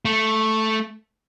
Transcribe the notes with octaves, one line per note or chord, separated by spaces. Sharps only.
A3